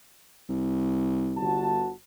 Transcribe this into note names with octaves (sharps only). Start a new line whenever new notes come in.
C2
G1 F#4 A5